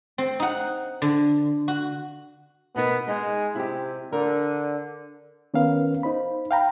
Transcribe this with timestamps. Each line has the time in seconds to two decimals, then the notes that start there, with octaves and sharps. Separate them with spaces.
0.18 C4
0.40 D#4 F#5
1.02 D3
1.68 F#4
2.76 B2 B3 D#4 A#4
3.08 G#3 D#4
3.55 C3 E4 G4
4.12 D3 A#4
5.54 D#3 B3 C#4 A#4 B4 F5
6.03 D#4 C5 B5
6.51 F5 G5 A#5 B5